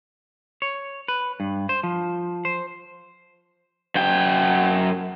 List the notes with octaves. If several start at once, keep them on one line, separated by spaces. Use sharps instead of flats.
C#5
B4
G2
C5
F3
C5
F#2 G5